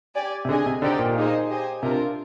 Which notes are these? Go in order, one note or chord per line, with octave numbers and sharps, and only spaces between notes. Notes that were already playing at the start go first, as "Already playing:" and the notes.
G4 D5 G#5
C3
D3 G#4 D#5 G#5
C3
D3 C4 D#4 G4 D5 G5
A#2
A#3 D#4 G#4 C5 D#5
G4 C5 D#5 G#5
C3 D4 F4 A#4